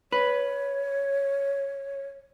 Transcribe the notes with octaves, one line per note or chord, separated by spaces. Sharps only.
B4 C#5